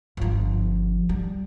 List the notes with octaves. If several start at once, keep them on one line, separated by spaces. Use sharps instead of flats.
G1 F3
G3